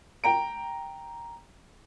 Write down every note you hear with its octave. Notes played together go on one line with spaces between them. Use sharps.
G5 A#5 D7